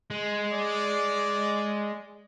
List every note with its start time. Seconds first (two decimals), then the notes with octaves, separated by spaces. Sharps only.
0.11 G#3
0.53 D5